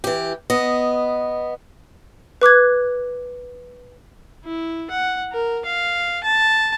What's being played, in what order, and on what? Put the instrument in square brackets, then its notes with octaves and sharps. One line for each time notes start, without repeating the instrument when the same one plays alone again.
[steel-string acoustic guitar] E3 G4
B3 D#5
[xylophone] B4 D6 F#6 G#6
[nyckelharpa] E4
F#5
A#4
F5
A5